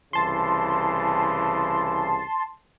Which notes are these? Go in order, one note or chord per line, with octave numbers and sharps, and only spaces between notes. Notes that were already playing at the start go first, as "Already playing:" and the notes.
C2 C#3 E3 A5 C6